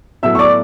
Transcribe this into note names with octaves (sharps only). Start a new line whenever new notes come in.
A2 F#3 B3 E5 E6
C#6
D5 D6